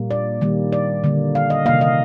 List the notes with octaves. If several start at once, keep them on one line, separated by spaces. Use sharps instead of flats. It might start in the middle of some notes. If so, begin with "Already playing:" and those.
Already playing: A#2 G3 A#3
D5
D#3 G3 A#3
D5
D3 G3 A#3
F5
D#5
C3 D#3 A#3 F5
D#5